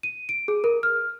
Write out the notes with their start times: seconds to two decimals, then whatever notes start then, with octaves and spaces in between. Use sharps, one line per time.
0.03 D#7
0.29 D7
0.48 G#4
0.64 A#4
0.83 F6